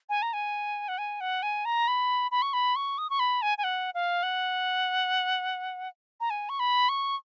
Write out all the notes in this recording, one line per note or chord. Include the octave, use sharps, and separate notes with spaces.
G#5
A#5
G#5
F#5
G#5
F#5
G#5
A#5
B5
B5
C#6
B5
C#6
D#6
C#6
B5
G#5
G#5
F#5
F5
F#5
A#5
G#5
C#6
B5
C#6